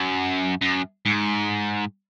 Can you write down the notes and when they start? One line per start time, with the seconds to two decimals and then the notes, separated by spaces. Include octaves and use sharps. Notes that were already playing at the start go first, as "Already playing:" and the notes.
Already playing: F#2
0.61 F#2
1.06 G#2